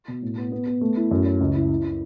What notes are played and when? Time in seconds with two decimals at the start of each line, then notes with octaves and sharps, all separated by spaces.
0.08 B2
0.22 A2
0.37 B3
0.52 B3
0.66 B3
0.81 A3
0.96 E4
1.11 F#2
1.26 C#4
1.40 C#2
1.55 E4
1.69 E4
1.84 E4